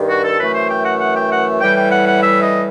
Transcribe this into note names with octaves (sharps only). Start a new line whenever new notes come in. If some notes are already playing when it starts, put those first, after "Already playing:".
Already playing: G2 D#3
F#4
A4
F#2 E3 A3 B4
C5
G5
F#5
F#5
G5
F#5
A2 E3 G3 G5
G5
F#5
F#5
E5
D#5